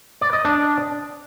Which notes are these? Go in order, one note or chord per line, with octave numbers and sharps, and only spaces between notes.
D5
D#5
D4